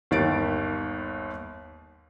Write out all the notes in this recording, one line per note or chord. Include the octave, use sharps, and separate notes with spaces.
G1 D#2 D#3 A#3 A6 D7